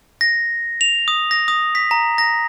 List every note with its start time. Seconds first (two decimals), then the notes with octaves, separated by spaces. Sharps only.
0.21 A#6
0.81 F7
1.08 D#6
1.31 A#6
1.48 D#6
1.75 B6
1.91 A#5
2.18 A#6